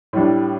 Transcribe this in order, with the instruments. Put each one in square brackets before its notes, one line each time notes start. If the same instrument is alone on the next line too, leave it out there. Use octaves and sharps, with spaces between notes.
[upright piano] A2 G3 D4